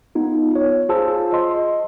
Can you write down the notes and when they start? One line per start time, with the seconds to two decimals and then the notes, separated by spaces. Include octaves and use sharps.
0.15 B3 D#4 F4
0.55 C#5
0.89 F4 G#4 C5 A5 E6
1.33 D#5 C6